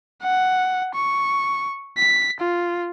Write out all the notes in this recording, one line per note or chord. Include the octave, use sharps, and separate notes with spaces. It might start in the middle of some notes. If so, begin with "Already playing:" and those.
F#5
C#6
B6
F4